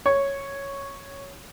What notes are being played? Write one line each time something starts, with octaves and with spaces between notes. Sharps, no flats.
C#5